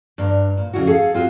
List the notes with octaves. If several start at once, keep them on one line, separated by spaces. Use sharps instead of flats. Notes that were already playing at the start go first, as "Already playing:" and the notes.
G2 D4 A#5
A#2
F2 C#3 E4 F#4
G#4 A4 E5 F5
C4 F4 F#4